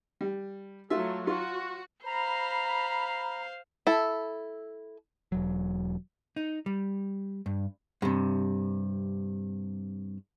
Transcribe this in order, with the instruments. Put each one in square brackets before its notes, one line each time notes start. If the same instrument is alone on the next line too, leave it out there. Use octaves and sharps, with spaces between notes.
[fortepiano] G3
[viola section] F#3 A3 [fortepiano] F4 E5
[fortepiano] F4 [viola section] F#4
[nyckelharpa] C5 F5 [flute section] A#5 B5
[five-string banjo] E4 A4
[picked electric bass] E1 F#3
[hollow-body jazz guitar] D#4
G3
G2
G2 C3